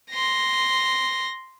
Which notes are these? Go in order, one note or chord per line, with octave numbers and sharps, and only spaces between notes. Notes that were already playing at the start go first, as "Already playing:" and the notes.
C6 A#6